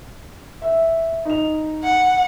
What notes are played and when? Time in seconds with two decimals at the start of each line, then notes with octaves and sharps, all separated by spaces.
0.62 E5
1.25 D#4 F7
1.83 F#5